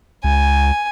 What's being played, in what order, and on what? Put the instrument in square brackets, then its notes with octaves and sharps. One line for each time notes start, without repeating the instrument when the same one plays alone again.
[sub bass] C#2 [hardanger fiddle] G#5